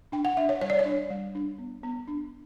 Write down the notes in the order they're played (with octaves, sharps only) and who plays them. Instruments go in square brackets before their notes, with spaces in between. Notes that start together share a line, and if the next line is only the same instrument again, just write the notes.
[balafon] D4 G5
F#5
D4 E5
C#5
G3 C#5
D5
C#5
D4
G3
D4
B3
B3
D4